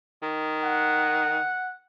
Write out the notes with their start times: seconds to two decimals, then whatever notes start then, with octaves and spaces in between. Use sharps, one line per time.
0.23 D#3
0.64 F#5